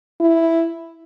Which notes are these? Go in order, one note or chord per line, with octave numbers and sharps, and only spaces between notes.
E4